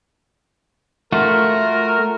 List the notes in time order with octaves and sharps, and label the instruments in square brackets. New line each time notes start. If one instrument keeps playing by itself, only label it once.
[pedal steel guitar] A3 F4 F#4 [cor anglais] A#4